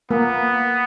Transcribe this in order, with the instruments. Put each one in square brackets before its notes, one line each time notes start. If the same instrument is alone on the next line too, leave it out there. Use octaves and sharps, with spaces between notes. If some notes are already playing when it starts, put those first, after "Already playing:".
[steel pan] A#3 [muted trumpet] B3